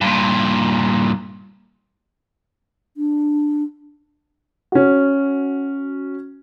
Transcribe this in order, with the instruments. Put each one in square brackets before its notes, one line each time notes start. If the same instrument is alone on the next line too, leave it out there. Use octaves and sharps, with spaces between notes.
[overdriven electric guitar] G2 A#2
[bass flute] D4
[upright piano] C#4 F#4